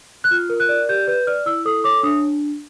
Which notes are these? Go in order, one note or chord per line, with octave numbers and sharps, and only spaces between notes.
F#6
F4 F6
A#4
F#6
D5
G4 G6
B4 G6
D5 F6
E4 E6
A4 D#6
C#5 D6
D4 D#6